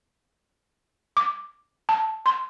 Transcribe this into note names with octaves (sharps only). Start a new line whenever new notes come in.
D6
A5
C6